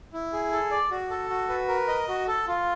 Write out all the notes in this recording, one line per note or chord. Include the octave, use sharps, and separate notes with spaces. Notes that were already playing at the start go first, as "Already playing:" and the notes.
E4
G#4
A4
D5
F#4
A4
F#4
B4
A#4
D#5
F#4
A4
F4